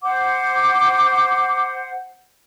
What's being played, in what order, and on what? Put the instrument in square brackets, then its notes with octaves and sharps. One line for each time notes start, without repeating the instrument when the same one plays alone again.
[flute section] C5 F#5 [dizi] D6